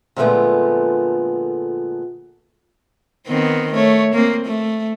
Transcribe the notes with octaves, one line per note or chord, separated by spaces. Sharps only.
A#2 D3 F3 G#3 A3 B3
D#3 B3 C4
A3 C#5
A#3 C4
A3